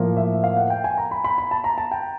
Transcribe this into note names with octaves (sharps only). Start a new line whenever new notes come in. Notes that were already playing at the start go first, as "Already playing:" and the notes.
Already playing: A2 F3 A#3
E5
F5
F#5
G5
G#5
A#5
B5
B5
B5
A5
A#5
A5
G5